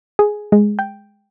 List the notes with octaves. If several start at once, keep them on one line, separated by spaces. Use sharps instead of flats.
G#4
G#3
G5